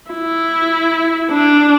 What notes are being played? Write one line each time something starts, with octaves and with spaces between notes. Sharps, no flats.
E4
D4